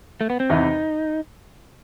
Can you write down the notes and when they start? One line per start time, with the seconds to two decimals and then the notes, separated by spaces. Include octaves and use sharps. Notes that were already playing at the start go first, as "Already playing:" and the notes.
0.21 A3
0.30 B3
0.40 C4
0.50 E2 C3 E3 D#4